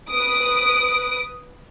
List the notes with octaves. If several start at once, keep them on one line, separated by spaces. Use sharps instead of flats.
B4 D#6 D7